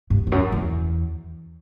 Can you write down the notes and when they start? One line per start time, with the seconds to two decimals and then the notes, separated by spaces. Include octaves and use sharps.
0.10 G2
0.27 E2
0.32 F#2
0.52 E2